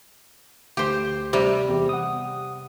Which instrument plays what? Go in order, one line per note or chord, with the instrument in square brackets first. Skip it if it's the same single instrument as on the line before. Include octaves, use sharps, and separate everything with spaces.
[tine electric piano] D2 [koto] G4 C5
[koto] C3 G3
[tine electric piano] E2 G4
F#5 D#6